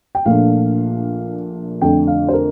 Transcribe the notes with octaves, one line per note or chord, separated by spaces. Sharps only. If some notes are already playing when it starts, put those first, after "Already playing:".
G5
A#1 A#2 A3 D4 F5
F2 D3 A3 D4 G5
F5
C5
A#4